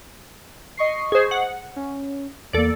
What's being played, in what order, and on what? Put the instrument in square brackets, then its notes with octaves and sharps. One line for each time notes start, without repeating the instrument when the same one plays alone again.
[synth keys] D#5 C#6 C7
[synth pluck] G#4 C5
F#5
[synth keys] C#4
[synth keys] E2 A#3 [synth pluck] A4 D5